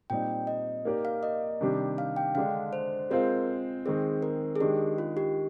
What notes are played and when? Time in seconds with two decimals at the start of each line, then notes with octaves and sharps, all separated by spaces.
0.10 A#2 G3 C4 D#4 G5
0.47 D#5
0.85 A#3 D#4 G4 A#4 D5
1.05 F5
1.23 D#5
1.61 C3 D#3 G3 D4 G4
1.98 F5
2.16 G5
2.35 D3 G#3 D4 F5
2.73 C5
3.10 G#3 C4 F4 A#4 C5
3.86 D#3 G#3 C4 G#4
4.23 A#4
4.56 G#4
4.60 D#3 G#3 D4 G4
4.98 F4
5.17 G4